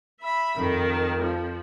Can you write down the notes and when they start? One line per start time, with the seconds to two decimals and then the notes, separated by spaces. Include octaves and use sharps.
0.20 E5 B5
0.57 F2 D#3
1.22 F3